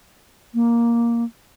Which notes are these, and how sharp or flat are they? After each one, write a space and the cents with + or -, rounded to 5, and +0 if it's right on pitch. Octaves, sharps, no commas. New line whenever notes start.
A#3 +5